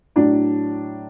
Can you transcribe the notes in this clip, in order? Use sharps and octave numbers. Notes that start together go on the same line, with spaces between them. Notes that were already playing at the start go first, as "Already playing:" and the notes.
A2 F#3 D4